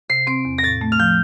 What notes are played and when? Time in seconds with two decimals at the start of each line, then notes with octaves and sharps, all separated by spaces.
0.10 C3 C7
0.27 C4 D7
0.45 E2
0.58 A#6
0.63 A2 A6
0.81 A3
0.92 F6
0.99 F3 G6